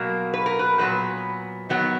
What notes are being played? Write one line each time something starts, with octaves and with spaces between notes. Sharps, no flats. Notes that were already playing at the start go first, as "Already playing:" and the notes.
Already playing: B2 F#3 A#3
B4
A#4
B4
A#2 F#3 B3 B4
D#3 F#3 B3